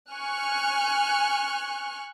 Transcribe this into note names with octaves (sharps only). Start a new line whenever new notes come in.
G#5 C#6 F6 F#6